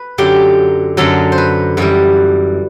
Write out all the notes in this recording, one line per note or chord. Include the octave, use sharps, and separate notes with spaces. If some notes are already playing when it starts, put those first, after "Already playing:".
Already playing: B4
F#2 D3 F#3 G4
F#2 D3 F#3 A4
C5
B4
F#2 E3 G3 B4